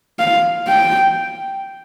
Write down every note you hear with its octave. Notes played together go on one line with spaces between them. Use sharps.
F5
G5